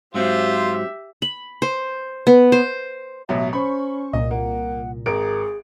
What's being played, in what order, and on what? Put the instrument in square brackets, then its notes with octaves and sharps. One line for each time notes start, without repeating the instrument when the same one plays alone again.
[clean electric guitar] G#2 F#3 C4 [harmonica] F4 C5 [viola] G4 E5
[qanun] B5
C5
B3
C5
[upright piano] A1 B2 F#3 [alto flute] E5
[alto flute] C#4 [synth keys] C5 C#6 [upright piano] B5
[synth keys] C2 A#2 [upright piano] D#5
[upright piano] A#3 [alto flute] F#5
[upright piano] G#1 A#4 D7 [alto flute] G#4